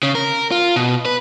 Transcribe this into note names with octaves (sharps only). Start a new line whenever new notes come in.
C#3
A#4
F4
B2
B4